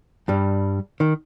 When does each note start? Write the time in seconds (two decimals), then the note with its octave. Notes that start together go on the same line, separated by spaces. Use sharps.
0.28 G2 G3
1.00 D#3